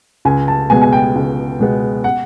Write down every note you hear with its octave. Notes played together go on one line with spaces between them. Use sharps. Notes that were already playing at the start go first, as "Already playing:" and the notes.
C#2 G#5
A5
B2 G#3 B3 G#5
G#5
G5
C#2
B2 G#3 B3
F#5